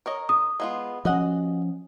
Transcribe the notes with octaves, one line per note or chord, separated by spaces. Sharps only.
A#4 C#5 D#5
D#6
G#3 B3 F4
F3 C#4 F#4 D#5 F#5